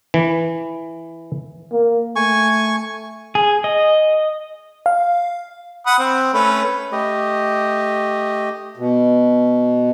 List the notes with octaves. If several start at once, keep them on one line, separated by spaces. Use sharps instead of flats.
E3
A#3
A3 G#5 C#6
G#4
D#5
F5
F#5 B5 D#6
C4
A3 C#4 B4
A3 G4 D#5
B2